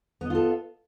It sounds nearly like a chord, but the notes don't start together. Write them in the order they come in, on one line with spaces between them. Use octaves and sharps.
B3 D#5 F4 A4